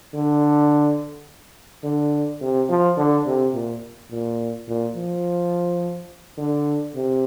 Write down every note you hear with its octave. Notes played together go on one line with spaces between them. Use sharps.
D3
D3
C3
F3
D3
C3
A#2
A#2
A#2
F3
D3
C3